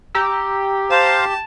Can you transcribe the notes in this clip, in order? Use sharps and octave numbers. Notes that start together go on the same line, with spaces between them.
G4 A#5 E6
C5 F5 A5